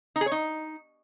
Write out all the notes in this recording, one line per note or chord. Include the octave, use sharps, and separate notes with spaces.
D#4
G#4
C#5
D#4